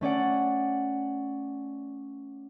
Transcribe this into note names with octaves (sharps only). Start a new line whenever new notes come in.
A3 C#4 D5 F#5